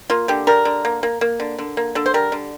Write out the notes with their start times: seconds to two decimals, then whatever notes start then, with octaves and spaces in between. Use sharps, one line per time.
0.10 A#3 F4
0.28 D3 G4
0.47 G3 A#4
0.65 D3
0.85 A#3
1.03 A#3
1.21 A#3
1.40 D3
1.58 D3
1.77 A#3
1.95 D3 A4
2.06 C5
2.14 G3 A#4
2.32 D3